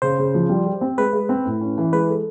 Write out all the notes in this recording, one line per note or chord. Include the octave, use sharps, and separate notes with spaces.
C#3 C5
C#3
F3
G3
G4
C4
G#3 B4
G#3
C4
A2
C#4
E3
G#3 B4
A4